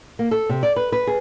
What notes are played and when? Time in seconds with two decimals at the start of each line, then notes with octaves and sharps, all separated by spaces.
0.19 A#3
0.31 A4
0.49 C3
0.63 D5
0.76 B4
0.92 B4
1.07 G#4